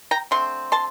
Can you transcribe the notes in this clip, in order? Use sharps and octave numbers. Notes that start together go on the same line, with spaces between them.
G5 A#5
D3 A3 C4 C6
A5 C6